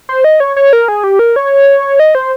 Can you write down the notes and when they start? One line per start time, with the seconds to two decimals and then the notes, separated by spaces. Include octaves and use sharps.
0.09 C5
0.24 D#5
0.40 C#5
0.56 C#5
0.73 A#4
0.88 G#4
1.04 G4
1.19 A#4
1.36 C#5
2.00 D#5
2.15 C5